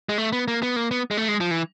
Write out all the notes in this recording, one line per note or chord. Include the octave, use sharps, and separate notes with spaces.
G#3
A3
B3
A#3
B3
A#3
B3
G#3
A3
G#3
F3
E3